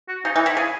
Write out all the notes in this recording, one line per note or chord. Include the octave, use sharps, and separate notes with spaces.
F#4
C#3 D#4
E3 D#4
D#3 E4
C#3 G#4